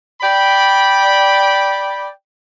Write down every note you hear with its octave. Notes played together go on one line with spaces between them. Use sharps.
D5 G5 B5